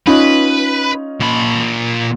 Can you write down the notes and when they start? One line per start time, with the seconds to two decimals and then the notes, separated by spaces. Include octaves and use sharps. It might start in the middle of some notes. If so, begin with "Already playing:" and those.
0.07 C#4 D#4 F4 B4
1.20 A#2 B5